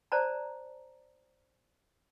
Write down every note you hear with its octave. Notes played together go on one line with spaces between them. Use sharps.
C5 D5 A5 A#5